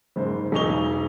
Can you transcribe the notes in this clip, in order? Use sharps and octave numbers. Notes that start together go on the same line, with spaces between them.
F#1 G#2 C5
E1 B1 D#4 C#6 F7 G7